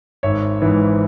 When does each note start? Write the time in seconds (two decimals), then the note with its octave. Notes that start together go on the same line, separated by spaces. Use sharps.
0.23 G#1 C#5 E5
0.62 G#2 E3